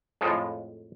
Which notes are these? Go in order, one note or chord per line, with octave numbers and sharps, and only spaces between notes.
F2 A2 F3 G#3